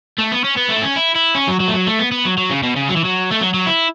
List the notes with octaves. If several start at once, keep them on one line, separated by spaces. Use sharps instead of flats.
A3
B3
C#4
B3
A3
E4
C#4
E4
E4
C#4
F#3
F#3
A3
F#3
A3
B3
B3
F#3
F#3
C#3
B2
C#3
F#3
E3
F#3
A3
F#3
F#3
E4